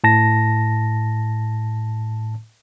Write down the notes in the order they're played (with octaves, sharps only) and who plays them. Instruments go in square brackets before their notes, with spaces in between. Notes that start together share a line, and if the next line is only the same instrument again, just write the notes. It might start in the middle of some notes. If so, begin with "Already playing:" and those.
[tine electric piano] A2 A5 A#6